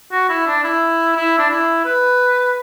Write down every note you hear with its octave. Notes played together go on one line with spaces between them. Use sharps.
F#4
E4
D4
E4
E4
D4
E4
B4